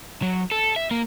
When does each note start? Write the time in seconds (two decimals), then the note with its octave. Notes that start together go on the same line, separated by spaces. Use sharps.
0.22 F#3
0.51 A4
0.76 E5
0.91 A#3